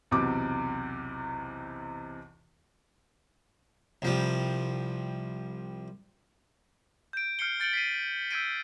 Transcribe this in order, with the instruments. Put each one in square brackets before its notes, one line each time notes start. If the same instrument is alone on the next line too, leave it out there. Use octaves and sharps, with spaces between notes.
[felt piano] B1 E2 C3 D6
[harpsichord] C2 F3 G3
[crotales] G6 D7
F6 G6 C7 C#7 G7
G6 A6 C#7 D7 F#7 G7
B6 C7 D#7
E6 G6 G#6 B6 D7 D#7